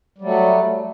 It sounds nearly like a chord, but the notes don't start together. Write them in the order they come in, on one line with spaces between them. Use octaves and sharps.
G3 F#3 A3